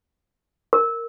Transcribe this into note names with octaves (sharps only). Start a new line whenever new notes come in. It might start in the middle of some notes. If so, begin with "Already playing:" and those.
A#4